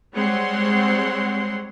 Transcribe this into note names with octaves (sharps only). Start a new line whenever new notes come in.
G3 G#3 C4 C#5 F#5 C6